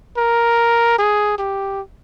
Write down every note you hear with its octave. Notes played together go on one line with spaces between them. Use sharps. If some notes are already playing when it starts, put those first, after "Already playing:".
A#4
G#4
G4